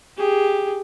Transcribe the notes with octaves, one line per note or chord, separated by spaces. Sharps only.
G4 G#4